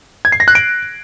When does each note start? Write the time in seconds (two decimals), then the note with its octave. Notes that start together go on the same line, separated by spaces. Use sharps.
0.25 G#6
0.32 C7
0.40 A#6
0.48 F#6
0.55 D7